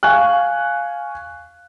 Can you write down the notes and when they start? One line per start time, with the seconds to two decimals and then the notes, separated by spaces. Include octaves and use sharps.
0.03 F5 G#5 C#6 F#6